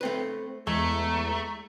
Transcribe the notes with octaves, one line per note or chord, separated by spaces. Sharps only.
A3 C4 B4
E2 G#3 A3 A#5